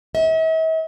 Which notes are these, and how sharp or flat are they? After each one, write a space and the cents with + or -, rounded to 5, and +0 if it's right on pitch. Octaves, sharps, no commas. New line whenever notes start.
E5 -45